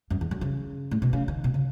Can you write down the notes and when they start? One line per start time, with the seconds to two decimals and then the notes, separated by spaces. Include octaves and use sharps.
0.10 F#2
0.21 E2
0.31 F#2
0.41 C#3
0.91 A2
1.02 B2
1.13 C#3
1.28 D#3
1.44 B2
1.54 C#3